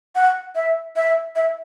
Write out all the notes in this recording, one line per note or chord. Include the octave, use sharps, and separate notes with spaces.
F#5
E5
E5
E5